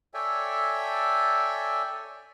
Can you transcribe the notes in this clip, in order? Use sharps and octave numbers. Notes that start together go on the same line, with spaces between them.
A4 C#5 D5 E5 G5 G#5